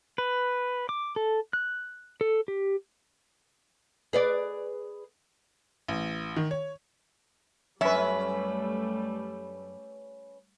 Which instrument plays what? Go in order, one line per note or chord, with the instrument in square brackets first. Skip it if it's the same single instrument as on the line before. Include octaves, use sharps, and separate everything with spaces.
[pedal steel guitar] B4
D6
A4
F#6
A4
G4
[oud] G#4 B4 D5
[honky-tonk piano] A1
D#3
C#5
[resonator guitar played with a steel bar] F#2 E5 [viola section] G3 A3 [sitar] C#4 B4